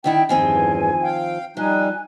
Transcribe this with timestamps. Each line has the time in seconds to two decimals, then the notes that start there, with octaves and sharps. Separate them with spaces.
0.04 D3 D#3 E4 G5
0.29 E2 G2 D#3 F3 C4 G#5
1.03 F5 G5
1.57 F3 G3 D#4 G#5 F#6